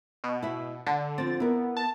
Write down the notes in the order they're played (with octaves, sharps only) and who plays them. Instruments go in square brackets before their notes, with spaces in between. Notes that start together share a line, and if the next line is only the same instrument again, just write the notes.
[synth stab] B2
[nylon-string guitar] E4 E5
[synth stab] D3 [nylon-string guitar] A5
[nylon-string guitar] F3 C4 [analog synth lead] A6
[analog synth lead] B3 [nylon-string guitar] E4 A#4
[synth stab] A5